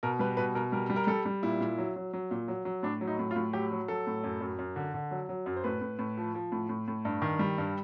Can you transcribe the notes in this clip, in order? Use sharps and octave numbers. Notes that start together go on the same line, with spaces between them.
B2 A#4
G3 B4
B2 B4
B2 A#4
G3 A#4
G3
A#4
G3 A4
G3
A#2 E4
A#2
F#3
F#3
F#3
A#2
F#3
F#3
A2 D4
F#3
D#4
A2
F4
A2
F#3 G4
F#3
F#3 A4
A2
F#2
F#2
F#2
D3
D3
F#3
F#3
F#2
C5
A2 B4
A2
A2
F3
F3
A2
A2
A2
G2
D#3
G3
G2